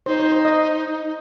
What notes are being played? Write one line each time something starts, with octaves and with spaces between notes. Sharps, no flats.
D#4 C5
C5
C5
D#5